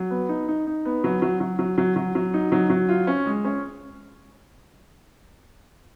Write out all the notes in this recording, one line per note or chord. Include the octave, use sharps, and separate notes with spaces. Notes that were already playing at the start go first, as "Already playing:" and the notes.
Already playing: F#3
B3
D#4
D#4
D#4
B3
F#3
F#3
F#3
F#3
F#3
F#3
F#3
D#4
F#3
F#3
F4
C#4
G#3
C#4